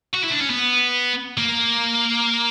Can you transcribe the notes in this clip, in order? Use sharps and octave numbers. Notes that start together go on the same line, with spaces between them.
F#4
E4
D4
C#4
B3
A#3